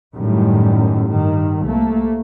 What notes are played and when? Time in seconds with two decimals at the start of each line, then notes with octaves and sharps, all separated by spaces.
0.15 F#2 A2 D#3 G3
1.08 G2 D#3
1.64 C2 A3 A#3